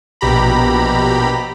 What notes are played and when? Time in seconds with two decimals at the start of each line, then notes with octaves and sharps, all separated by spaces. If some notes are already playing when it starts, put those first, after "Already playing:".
0.21 A#1 B2 G4 A#5 B5